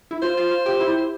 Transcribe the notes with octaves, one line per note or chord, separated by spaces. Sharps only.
E4
F4 C5
F4
F4
G4
E4